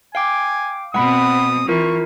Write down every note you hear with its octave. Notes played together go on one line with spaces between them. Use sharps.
F5 G5 G#5 D6
B2 C4 F#5 B5 D#6
E3 F4 A#4 C#6